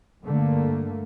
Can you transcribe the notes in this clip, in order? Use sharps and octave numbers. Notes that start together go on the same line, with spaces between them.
G2 D3 A3 A#3